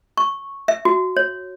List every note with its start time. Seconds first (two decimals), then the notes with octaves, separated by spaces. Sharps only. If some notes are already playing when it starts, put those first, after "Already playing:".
0.17 C#6
0.68 E5
0.85 F#4
1.17 C#5